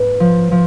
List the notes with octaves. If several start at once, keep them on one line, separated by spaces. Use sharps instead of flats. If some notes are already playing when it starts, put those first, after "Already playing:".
Already playing: G#2 A#3 B4
F3
F3